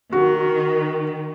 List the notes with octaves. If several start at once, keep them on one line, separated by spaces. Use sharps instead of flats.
D#3 F#4